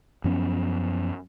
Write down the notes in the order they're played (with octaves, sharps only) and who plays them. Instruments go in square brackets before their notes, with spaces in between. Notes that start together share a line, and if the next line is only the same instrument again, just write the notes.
[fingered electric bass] F#2 F3 B3 C#4